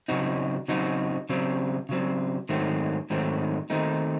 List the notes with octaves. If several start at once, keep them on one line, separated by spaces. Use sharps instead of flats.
C#3 F#3 C4 D#4 F#4
C#3 F#3 C4 D#4 F#4
C#3 F#3 C4
C#3 F#3 C4
G#2 D#3 F#3 A3 C4
G#2 D#3 F#3 A3 C4
D#3 A3 C4 D#4